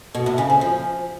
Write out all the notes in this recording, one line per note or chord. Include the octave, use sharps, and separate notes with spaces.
B2
A2
C#3
C4
F3